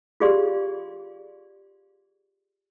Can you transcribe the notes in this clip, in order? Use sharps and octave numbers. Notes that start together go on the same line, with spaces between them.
F4 G4 G#4 D5 F5 C6